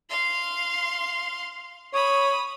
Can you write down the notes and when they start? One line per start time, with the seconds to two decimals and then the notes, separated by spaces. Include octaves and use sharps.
0.10 F5 C6
1.94 C#5 B5 D#6